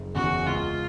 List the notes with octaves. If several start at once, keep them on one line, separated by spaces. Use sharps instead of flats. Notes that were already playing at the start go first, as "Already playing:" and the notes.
Already playing: F#1
E2 C#3 F#4
C#2 F4